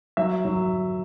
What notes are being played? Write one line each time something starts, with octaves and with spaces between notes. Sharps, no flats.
F#3 E5
F#3